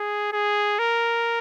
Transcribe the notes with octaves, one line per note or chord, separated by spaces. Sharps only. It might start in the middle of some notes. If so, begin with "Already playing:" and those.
Already playing: G#4
G#4
A#4